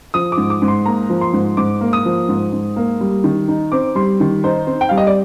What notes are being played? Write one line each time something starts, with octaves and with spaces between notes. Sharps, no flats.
F3 D#6
D6
G#2
D6
G#2
C6
A#3 A#5
F3
C6
G#2
G#2 D6
A#3
D#6
F3
G#2
G#2
A#3
G3
D#3
D#4
C4 D6
G3 C6
D#3
D#4 C5
C4
G5
G3 F5
D#5
D5